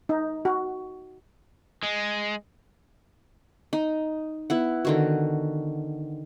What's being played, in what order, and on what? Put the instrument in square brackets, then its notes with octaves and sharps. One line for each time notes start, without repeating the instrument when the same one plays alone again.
[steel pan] D#4
F#4
[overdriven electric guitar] G#3
[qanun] D#4
B3 E4 F#5
D3 D#3 F#4